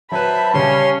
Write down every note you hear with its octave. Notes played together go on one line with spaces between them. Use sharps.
F#3 B4 C5 E5 A5 B5
C#3 G3 C#4 C#5 C6